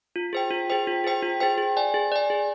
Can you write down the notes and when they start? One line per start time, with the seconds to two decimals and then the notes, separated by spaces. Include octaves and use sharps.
0.16 F4
0.33 G#4 C5 G5
0.51 F4
0.70 G#4 C5 G5
0.87 F4
1.04 G#4 C5 G5
1.22 F4
1.40 G#4 C5 G5
1.58 G#4
1.77 D5 G#5
1.94 G#4
2.12 D5 G#5
2.30 G#4